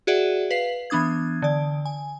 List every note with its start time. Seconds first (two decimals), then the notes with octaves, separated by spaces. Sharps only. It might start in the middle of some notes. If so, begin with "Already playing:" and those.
0.07 F#4 G#4 D5 E5 F#5
0.51 B4 F5 C7
0.90 E3 B3 D4 D#6 G#6
1.42 D3 D5
1.85 G#5